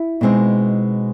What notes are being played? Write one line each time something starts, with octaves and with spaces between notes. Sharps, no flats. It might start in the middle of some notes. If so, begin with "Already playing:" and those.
Already playing: E4
B2 G#3 C4 D#4